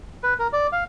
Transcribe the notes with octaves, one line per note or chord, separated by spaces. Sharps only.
B4
A#4
D5
F5